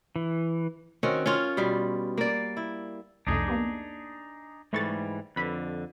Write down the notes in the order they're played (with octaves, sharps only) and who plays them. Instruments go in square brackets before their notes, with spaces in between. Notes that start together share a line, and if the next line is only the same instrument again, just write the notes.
[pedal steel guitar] E3
[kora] D#3 C4 C#4 F#4
C#4 F4
B2 G3
A#3 D5
E4
[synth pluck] C2 F2 A3 [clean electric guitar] D4 D#4 G#4
[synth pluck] A#3 B3 G4
[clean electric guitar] G#2 E3 G3 [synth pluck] A3 C#6 A6
[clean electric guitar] F2 D3 [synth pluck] B4 B5